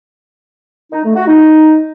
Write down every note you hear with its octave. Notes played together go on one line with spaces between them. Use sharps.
D#4
A3
F#4
D#4